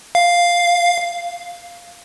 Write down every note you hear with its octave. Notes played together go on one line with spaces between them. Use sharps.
F5